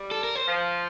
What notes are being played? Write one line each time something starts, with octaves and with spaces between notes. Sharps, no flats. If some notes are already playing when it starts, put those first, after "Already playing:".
Already playing: G3
A4
A#4
C5
F3